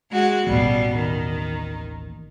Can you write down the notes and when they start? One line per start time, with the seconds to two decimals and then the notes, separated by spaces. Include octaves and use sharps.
0.11 G#3 F#4
0.47 A1 D#2 B2 G3
0.96 D#3